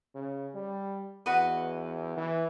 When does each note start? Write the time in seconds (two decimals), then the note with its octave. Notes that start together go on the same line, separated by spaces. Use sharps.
0.15 C#3
0.54 G3
1.26 E2 F#4 B4 D#5
2.17 E3